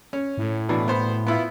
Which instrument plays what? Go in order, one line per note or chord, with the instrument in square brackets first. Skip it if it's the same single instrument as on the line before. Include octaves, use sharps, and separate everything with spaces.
[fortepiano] C#4
[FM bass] A2
[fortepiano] B2 E3 D4
B3 C5
B3 E4 F4